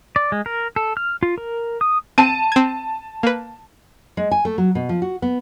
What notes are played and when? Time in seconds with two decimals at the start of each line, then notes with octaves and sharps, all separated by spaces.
0.16 D5
0.32 G#3
0.46 A#4
0.76 A4
0.97 F6
1.23 F4
1.38 A#4
1.81 D#6
2.18 C4 A5 D#7
2.52 C4 G#6
3.23 A#3 B4
4.17 G#3
4.31 G#5
4.45 A3
4.58 F#3
4.75 B2
4.89 F3
5.02 F#4
5.22 B3